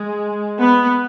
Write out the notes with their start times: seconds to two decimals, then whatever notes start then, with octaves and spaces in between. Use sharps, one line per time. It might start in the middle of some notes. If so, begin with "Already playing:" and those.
Already playing: G#3
0.60 B3